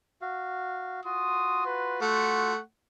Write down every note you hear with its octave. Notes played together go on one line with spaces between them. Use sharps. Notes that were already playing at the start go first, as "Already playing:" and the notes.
F#4 F5
F4 F#4 C6 D#6
B4
A3 F#5 C#6